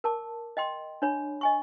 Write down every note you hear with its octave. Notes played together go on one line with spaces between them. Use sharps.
A#4 A5 D6
D#5 G5 C6
D4 C#5 B5
D#5 G#5 C#6